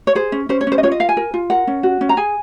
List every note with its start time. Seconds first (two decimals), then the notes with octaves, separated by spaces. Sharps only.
0.07 C#5
0.15 G#4 C5
0.32 C#4
0.49 C#4 C5
0.61 C#5
0.67 C#4 C5
0.78 D#5
0.83 F4 C#5
0.92 D#5
1.00 A#4 F5
1.09 G#5
1.17 A#4
1.34 F4
1.50 A#4 F#5
1.67 C#4
1.83 F#4
2.01 C#4
2.09 A#5
2.17 G#4 G#5